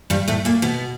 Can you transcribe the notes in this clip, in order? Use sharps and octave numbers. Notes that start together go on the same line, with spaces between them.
G2 G3
A2 A3
A#2 A#3
B2 B3